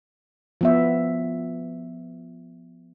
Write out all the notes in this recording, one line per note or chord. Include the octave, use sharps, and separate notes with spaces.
F3 B3 E5